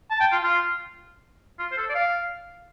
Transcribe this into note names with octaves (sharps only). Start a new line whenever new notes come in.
A5
G5
F4
F4
F4
C5
A4
D5
F5